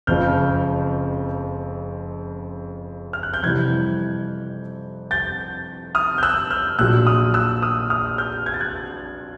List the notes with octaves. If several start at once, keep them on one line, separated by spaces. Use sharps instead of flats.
F#1 F2 C#3 F3 F6 G6
F6
F#6
G6
F2 C3 E3 G3 F#6 G#6
G6 A6
D#6 F6
G6
E6 F#6
F6 G6
A#1 A#2 F#3 E6 F#6
D#6 F6
E6 F#6
D#6 F6
D#6 F6
F6 G6
G#6
A6
F#6 G#6